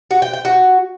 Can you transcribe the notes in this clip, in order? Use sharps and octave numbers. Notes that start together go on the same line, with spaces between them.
F#4
G5
G5
F#4